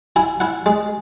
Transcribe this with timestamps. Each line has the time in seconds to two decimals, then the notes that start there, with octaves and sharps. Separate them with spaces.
0.16 E4 G#5
0.40 E4 F#5
0.66 G#3